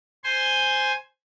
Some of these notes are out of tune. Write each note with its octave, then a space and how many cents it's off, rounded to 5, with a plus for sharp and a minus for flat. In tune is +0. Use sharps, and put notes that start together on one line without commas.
C5 +0 G#5 +0 C6 +0